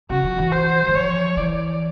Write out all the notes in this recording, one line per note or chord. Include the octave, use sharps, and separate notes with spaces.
C#3 F#4
F3
E3
C5
E3
F3 C#5
E3 D5